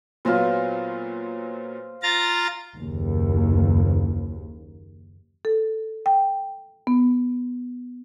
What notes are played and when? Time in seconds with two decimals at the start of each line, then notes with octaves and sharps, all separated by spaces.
0.25 A#2 F#3 B3 F4 C5
2.03 F4 A#5 A6
2.75 F#1 D#2
5.45 A4
6.06 G5
6.87 B3